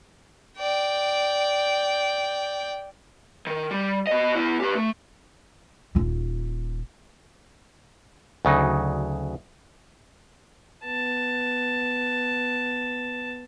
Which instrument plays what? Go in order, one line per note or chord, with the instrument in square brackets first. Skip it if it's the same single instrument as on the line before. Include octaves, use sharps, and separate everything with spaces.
[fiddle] D5 G5
[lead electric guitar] D#3
G3
B3 D#5
B3 E4
G4 B4
A3
[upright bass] D#1 F4
[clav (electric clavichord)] D2 C#3 F#3 D#4
[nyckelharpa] B3 A5